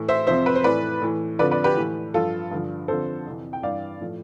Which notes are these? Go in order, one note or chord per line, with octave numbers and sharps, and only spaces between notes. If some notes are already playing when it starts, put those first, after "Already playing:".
Already playing: A2 E3
C5 E5
F2 C3 F3 C5 E5
B4
C5
A2 E3 B4 D5
A2 E3
F2 D3 F3 B4 D5
B4 D5
G4 B4
A2 E3
G2 F3 F4 A4
G2 D3 F3
F2 D3 F3 A4 C5
F2 C3 E3
G5
G2 E3 D5 F5
A2 F3